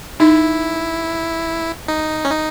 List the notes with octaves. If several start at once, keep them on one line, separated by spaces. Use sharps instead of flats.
D#4 E4
D#4
C#4
D#4